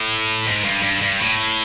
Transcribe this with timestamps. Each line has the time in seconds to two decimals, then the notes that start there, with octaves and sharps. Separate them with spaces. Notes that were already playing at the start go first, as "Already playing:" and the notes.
Already playing: A2
0.46 G#2
0.64 G2
0.82 G2
1.01 G2
1.20 A2